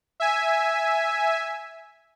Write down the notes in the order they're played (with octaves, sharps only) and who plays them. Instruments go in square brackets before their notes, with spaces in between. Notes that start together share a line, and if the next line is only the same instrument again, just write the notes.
[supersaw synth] E5 G#5